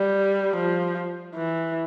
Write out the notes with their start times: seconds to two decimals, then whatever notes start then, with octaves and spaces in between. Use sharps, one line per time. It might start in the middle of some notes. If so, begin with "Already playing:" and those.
Already playing: G3
0.56 F3
1.34 E3